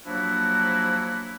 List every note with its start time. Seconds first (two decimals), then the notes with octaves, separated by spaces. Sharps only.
0.06 F3 F#3 A#3 D4 E4 F#4